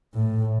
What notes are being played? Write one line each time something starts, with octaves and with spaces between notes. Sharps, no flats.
A2